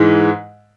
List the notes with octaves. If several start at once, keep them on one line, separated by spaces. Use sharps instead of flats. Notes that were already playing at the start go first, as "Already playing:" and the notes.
Already playing: G#2 E3 G#3